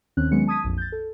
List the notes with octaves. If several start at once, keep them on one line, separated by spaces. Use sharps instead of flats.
D#2 D#3 C4 C#4 F#6
D#3 F#3 G#3 B3 C#4 C#7
A5 D#6 G#6 B6 D#7
A#1 F2
G6 A6
A4